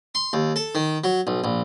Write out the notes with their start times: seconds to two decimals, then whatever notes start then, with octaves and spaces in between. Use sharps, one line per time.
0.15 C6
0.33 D#2
0.56 A4
0.75 D#3
1.04 F#3
1.27 B1
1.44 A#1